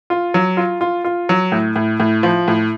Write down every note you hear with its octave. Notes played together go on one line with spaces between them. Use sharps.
F4
F#3
F4
F4
F4
F#3
A2
A2
A2
F3
A2